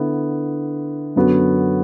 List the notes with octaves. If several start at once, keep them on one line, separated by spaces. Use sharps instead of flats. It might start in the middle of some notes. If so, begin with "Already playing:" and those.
Already playing: D3 B3 E4
F#2 D3 B3 F#4